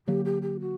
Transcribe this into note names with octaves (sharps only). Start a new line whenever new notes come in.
D3 F#3 A#3 G4
G4
G4
F#4